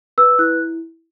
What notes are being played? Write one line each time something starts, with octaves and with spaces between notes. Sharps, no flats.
B4 E6
E4 F#6